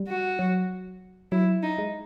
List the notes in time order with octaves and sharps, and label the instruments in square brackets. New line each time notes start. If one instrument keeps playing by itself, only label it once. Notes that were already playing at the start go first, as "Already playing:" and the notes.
Already playing: [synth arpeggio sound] G3
[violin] F#4
[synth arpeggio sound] F#3
[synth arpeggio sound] F#3 [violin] E4
[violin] D#4
[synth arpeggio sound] G#3